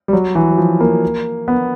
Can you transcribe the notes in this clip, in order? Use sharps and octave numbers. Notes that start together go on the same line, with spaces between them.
G3
F#3
E3
F#3
F3
A#3
B3